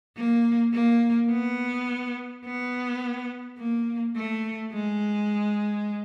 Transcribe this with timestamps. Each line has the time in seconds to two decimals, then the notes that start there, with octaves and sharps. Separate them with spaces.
0.16 A#3
0.73 A#3
1.31 B3
2.44 B3
3.58 A#3
4.16 A3
4.73 G#3